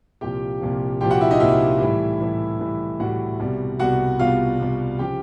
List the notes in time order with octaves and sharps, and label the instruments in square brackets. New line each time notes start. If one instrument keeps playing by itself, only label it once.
[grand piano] C2 A#2 F3 G4 G5
C2 A#2 F3
C2 A#2 F3 G4 G5
F#4 F#5
E4 E5
D#4 D#5
C2 A#2 F3 E4 E5
A2 E3 G3
A2 E3 G3
A2 E3 G3
A2 E3 G3 F#4 F#5
C2 B2 G3
C2 B2 G3 F#4 F#5
C2 B2 G3 F4 F5
C2 B2 G3
C#3 F3 G4 G5